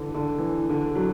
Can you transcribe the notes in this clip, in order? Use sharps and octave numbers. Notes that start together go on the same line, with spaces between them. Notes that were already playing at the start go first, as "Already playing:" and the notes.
Already playing: D3 E3
D3
E3
D3
F#3